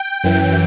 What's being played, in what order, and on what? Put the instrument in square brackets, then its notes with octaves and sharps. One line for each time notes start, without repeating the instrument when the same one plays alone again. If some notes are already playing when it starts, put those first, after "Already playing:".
Already playing: [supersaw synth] G5
F#2 E3